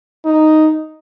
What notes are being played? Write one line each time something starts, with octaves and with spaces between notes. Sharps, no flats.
D#4